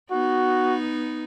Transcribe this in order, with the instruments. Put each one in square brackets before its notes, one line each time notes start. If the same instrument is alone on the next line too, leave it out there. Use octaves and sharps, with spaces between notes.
[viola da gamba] B3 D#4 [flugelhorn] F#4